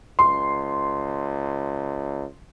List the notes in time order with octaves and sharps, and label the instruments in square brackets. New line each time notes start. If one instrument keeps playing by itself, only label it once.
[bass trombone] C#2 [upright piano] C6